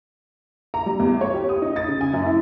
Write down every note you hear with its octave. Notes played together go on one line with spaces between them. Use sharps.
A#5
G3
E2
C#5
G4
D#6
D#4
A6
C#3
G#5
F#2
E4